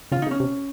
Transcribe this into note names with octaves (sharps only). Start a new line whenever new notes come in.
C#3 F4
D#4
C#3
C#4
C3